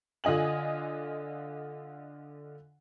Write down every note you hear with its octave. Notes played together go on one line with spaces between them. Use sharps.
D3 F4 D#5 G#5 F#7